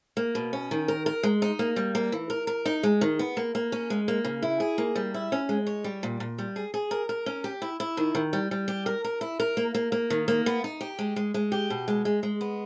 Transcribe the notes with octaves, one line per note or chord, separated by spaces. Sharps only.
A#3
B2
C#4
D#3
A#4
A#4
G#3
D#4
A#3
G3
A#3
E3
A#4
A#4
D#4
G#3
D#3
B3
A#3
A#3
C#4
G#3
A#3
C#3
E4
G#4
A#3
G3
E4
C#4
G#3
C#5
G3
A#2
A#2
G3
G#4
G#4
A#4
A#4
C#4
G4
E4
E4
D#3
D#3
G3
G3
G4
A#4
A#4
E4
A#4
A#3
A#3
A#3
D#3
A#3
B3
D#4
G4
G#3
G#3
G#3
G4
B2
G#3
G#3
G#3
B3